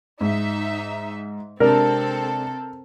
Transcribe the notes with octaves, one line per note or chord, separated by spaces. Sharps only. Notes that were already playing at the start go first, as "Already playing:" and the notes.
G#2 D#4 E5
C3 G#3 C4 D4 A4 A#4